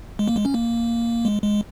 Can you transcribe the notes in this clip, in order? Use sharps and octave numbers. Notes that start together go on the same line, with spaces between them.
G#3
A#3
G#3
C#4
A#3
G#3
G#3